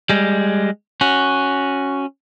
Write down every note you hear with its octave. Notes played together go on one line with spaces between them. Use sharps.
G3 G#3
C#4 F#4